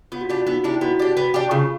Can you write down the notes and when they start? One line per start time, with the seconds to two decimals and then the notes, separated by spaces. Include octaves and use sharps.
0.12 B3 F4
0.21 F#4
0.29 D4 F4 G4
0.46 B3 D#4
0.64 D4 E4 G4
0.81 B3 F#4
0.99 D4 G4
1.17 B3
1.34 D4 G4
1.51 C#3 F4